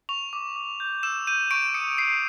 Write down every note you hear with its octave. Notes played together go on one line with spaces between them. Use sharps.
C#6 F7
D6
D6
G6
E6 E7
G6 D#7
C#6 D7
D#6 C#7
D#6 C7